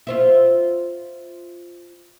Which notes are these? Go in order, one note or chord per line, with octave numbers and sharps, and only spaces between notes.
F4 C5 E5